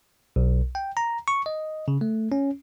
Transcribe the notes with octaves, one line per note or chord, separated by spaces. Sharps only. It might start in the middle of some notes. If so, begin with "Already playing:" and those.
B1
G5
A#5
C#6
D#5
C#3
A3
C#4